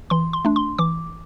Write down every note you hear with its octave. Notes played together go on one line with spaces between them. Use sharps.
E3 C6
C6
A3 D4
C6
E3 D6